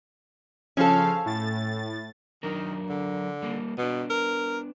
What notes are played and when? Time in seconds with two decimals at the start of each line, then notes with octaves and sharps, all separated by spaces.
0.77 C#3 F3 C#4 A4 F5
1.26 A2 A6
2.43 D#3 F#3 D4 A#4
2.89 D3
3.42 G3 A#3
3.78 B2 B3 D4
4.10 A#4